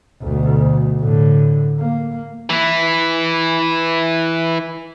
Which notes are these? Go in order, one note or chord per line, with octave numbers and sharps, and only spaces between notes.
D2 B2
A2 D3
A#3
E3 E4